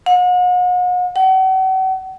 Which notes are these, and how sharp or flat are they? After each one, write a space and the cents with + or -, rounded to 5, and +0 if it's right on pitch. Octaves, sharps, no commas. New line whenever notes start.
F#5 -40
F#5 +40